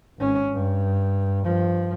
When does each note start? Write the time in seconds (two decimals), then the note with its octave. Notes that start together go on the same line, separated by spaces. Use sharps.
0.18 G#1 C#4
0.52 G2
1.44 G2 F3